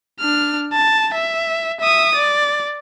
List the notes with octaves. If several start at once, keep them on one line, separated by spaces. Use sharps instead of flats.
D4 F6
A5
E5
E5 D#6
D5